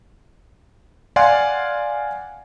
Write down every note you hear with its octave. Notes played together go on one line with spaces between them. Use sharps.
D5 F5 F#5 G#5 C6